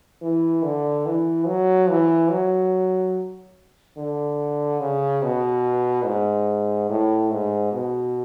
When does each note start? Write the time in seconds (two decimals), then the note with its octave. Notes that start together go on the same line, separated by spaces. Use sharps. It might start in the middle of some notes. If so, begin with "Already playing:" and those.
0.22 E3
0.64 D3
1.06 E3
1.47 F#3
1.89 E3
2.30 F#3
3.97 D3
4.80 C#3
5.23 B2
6.06 G#2
6.90 A2
7.31 G#2
7.73 B2